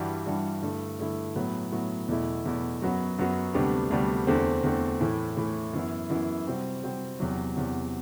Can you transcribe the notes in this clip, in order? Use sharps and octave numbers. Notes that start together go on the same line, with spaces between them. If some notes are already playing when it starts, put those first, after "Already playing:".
Already playing: G2 E3 G3 D4 F#4
G2 E3 G3 D4 F#4
G2 D3 A3 E4
G2 D3 A3 E4
A2 F#3 B3 F#4
A2 F#3 B3 F#4
E2 B2 A3 E4
E2 B2 A3 E4
F#2 F#3 B3 F#4
F#2 F#3 B3 F#4
D2 C3 G3 B3 D4
D2 C3 G3 B3 D4
E2 D3 A3 C4
E2 D3 A3 C4
A2 E3 A3
A2 E3 A3
F#2 E3 B3 E4
F#2 E3 B3 E4
C3 G3 C4 F#4
C3 G3 C4 F#4
E2 C3 F#3
E2 C3 F#3